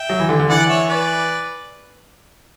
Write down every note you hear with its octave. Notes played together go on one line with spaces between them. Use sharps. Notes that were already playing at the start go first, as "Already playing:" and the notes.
Already playing: E5 G5
F#3
E3
D3
D3
E3 D5 F#5
C#5 E5
B4 D5